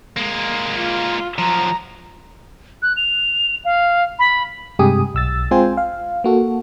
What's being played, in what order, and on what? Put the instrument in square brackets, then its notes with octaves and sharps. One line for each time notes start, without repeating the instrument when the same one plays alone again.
[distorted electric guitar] G#3 A#3
[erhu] F4
[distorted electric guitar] F3 F#3 [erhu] A#5
[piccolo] F#6
F7
F5
B5
[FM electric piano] G2 C3 G#3 G4 G#5 D#6
B1 E6 A6
G#3 C4 F4 C5 G5 G#5
F5
A#3 F#4 A4